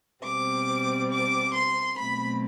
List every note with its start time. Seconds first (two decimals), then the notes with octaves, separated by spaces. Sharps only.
0.23 B2 G3 C4 D6
1.11 D6
1.54 C6
1.99 B2 F#3 A3 C4 B5